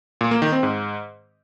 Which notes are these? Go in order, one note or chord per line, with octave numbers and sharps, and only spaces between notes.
A#2
A#3
D#3
C4
G#2